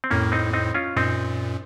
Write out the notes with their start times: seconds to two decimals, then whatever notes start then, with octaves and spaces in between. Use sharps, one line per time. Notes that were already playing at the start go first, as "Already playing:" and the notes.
0.04 C4
0.10 F2 A2 A#3 C#4
0.32 C4 D#4
0.53 C4 D#4
0.74 C#4 F4
0.96 F#2 A#2 C4 D#4